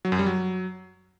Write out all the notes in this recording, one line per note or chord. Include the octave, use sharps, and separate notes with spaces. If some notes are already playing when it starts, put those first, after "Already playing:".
F#3
F#2
G3
F#3